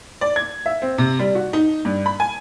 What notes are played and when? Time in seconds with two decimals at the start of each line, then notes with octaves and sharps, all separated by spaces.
0.21 D5
0.36 G#6
0.66 E5
0.82 C4
0.98 C3
1.19 G3
1.35 F#4
1.53 D#4
1.85 G2
2.06 B5
2.20 G#5